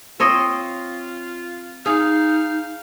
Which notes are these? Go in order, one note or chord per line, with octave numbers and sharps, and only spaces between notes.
C4 F4 C#5 D#5
D#4 G#4 F5